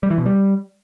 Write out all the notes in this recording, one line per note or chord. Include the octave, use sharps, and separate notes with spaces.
G3
E3
B2
G3